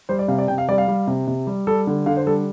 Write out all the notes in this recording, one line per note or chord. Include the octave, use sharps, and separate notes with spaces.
G3 C5
D5
C3 F5
D5
C3 G5
F5
G3 D5
F5
G3
C3
C3
G3
G3 A4
D3
D3 F5
C5
G3 A4